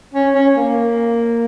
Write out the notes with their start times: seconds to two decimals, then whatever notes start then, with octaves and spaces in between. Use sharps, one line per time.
0.14 C#4
0.35 C#4
0.57 A#3